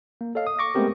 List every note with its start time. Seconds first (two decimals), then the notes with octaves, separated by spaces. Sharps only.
0.21 A#3
0.35 A4 C#5 D#5 F5
0.47 D#6
0.59 C#6 D6 A#6
0.75 G#3 A3 B3 C4 G4 A#4